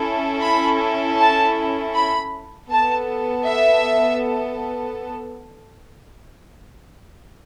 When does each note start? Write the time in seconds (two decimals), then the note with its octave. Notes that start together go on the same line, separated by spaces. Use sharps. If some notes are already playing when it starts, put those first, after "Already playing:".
Already playing: C#4 E4 A4
0.41 B5
1.18 A5
1.94 B5
2.69 B3 A4 A5
3.45 E5